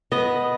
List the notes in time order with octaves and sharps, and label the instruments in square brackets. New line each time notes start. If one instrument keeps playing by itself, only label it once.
[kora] B3 D#5